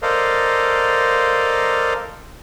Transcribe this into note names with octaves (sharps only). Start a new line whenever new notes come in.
A4 A#4 C5 D5 D#5 F5